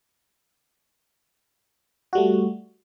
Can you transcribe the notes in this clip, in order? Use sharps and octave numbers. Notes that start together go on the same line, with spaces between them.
G3 A3 F#4